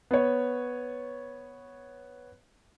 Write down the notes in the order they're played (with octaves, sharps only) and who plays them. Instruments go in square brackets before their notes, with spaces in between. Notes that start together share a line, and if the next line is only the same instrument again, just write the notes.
[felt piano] B3 C#5